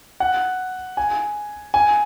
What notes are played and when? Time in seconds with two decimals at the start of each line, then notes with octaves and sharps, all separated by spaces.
0.20 F#5
0.97 G#5
1.74 G#5